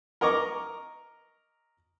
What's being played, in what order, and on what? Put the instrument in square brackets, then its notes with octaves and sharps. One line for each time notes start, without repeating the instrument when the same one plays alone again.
[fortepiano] A#4 D#5 A#5 C#6 D6